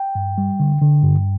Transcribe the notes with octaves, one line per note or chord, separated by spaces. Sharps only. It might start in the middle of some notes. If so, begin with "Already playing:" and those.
Already playing: G5
G2
G3
D3
D3
G2